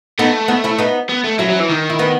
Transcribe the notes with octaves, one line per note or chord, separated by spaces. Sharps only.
A3 B3 D#4
B3 D#4
C#4 E4
B3 D#4
B3
A3
F#3 C#4 E4
F#3
E3
D#3
E4
B3 D#4